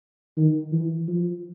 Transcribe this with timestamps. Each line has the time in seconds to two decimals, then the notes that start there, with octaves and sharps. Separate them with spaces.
0.37 D#3
0.72 E3
1.08 F3